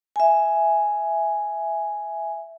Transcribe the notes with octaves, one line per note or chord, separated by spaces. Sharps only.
E5 G#5